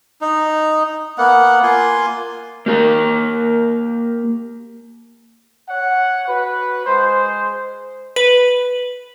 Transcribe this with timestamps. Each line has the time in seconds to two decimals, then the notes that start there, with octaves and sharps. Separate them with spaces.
0.21 D#4
1.18 A#3 B3 F#5
1.63 A#3 F4 G#5 C6
2.66 A#3 G4 A#4
5.69 C#5 F#5
6.28 F#4 B4
6.86 G#3 C5
8.16 B4